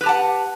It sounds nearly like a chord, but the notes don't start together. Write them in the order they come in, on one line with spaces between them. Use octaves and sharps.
B4 G4 A5 F#5